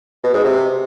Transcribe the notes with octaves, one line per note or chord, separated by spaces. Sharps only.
B2
G#2
C3